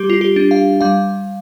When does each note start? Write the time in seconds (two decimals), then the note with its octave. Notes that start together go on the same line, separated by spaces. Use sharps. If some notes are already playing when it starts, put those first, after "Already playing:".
Already playing: G3 G4
0.10 F4
0.21 G4
0.36 D4
0.51 F5
0.81 G3 F5